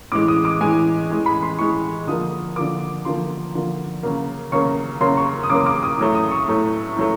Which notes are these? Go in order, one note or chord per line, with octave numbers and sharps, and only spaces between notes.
A2 E3 G#3 D6
D#6
D6
A2 E3 G#3 G#5
A2 E3 G#3
B5
C6
A2 E3 G#3 C#6
D3 F3 A#3 D#6
D3 F3 A#3 D6
D3 F3 A#3 C6
D3 F3 A#3
C#3 F#3 A#3
C#3 F#3 A#3 C#6
C#3 F#3 A#3 C6
C#6
D#6
C#3 F#3 A#3 D6
D6
D#6
A2 F#3 A3
D#6
C#6
A2 F#3 A3
A2 F#3 A3